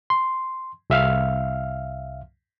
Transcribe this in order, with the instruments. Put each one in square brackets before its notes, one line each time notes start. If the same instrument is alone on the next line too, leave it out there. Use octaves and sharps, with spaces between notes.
[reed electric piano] C6
C2 E5 F5 F6